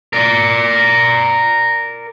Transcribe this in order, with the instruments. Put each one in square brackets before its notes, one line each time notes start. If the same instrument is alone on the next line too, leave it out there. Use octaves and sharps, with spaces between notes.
[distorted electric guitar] A#4 D5